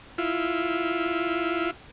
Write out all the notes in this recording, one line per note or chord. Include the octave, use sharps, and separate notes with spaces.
E4 F4